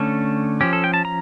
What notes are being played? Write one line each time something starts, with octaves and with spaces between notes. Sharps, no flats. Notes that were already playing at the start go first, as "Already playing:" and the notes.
Already playing: D3 A3 C#4 A4
F3 C#4 G4
A4
G5
A5
A#5